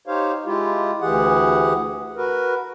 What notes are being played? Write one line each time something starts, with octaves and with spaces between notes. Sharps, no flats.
D#4 G4 C5 C#5 F5
G#3 E4 F4 G4
D2 E3 G4 G#4 F#5
F#4 A#4 B4